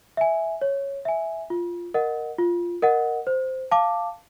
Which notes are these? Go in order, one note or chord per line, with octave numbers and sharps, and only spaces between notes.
E5 G#5
C#5
E5 G#5
F4
A#4 D#5 F#5
F4
A#4 D#5 F#5
C5
F5 A5 D6